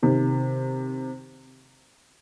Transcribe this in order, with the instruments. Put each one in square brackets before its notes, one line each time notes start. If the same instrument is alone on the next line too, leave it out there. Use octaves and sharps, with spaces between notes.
[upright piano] C3 D#3